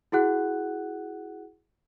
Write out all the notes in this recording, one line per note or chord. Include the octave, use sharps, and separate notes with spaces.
E4 F#4 G#4 F#5 F#6